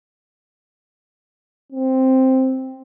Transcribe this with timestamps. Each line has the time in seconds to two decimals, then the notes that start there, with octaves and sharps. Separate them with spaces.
1.72 C4